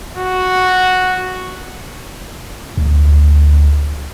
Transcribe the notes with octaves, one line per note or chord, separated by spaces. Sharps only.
F#4
D2